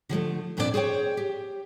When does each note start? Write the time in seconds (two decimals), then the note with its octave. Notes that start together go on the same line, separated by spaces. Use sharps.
0.09 D3 F3 G#3 A3
0.57 F2 A#2 C4 D4 G#4 D5
0.74 G#4 C5 C#5 G5
1.17 G4